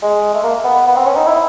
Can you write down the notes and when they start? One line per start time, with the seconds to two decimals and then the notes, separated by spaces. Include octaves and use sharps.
0.02 G#3
0.34 A3
0.44 A#3
0.64 B3
0.88 B3
0.96 C4
1.06 C#4
1.16 D#4
1.27 E4